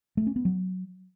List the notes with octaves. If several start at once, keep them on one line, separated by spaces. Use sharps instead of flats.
A3
C#4
B3
F#3